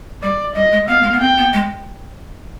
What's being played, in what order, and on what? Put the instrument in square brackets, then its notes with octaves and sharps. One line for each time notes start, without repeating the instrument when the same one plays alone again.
[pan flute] G3 [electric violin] D5
[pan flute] G3 [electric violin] D#5
[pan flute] G#3
[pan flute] B3 [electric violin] F5
[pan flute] G#3
B3
[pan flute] C4 [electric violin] G5
[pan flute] B3
G#3